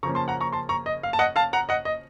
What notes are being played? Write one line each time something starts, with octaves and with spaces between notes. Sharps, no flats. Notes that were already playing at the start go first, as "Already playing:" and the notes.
C#3 F3 A#3 C#4 A#5 C#6
A5 C6
F#5 A#5
A#5 C#6
A5 C6
A#5 C#6
D#5
F5
A5
D#5 F#5
F5 A5
F#5 A#5
D#5 F#5
D#5